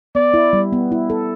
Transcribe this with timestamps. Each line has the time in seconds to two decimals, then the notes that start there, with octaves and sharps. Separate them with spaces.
0.15 B3 D5
0.34 E4
0.53 G3
0.73 B3
0.92 E4
1.10 A4